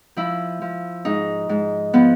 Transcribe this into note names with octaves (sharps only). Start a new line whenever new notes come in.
F3 E4
F3
G#2 D#4
G#2
F3 B3